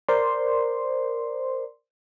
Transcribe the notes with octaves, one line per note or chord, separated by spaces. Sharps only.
A#4 C5 D5 C6